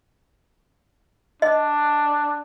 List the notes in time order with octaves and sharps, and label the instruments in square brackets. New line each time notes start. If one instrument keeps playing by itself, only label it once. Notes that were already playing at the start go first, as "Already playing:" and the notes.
[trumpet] D4 [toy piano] D#5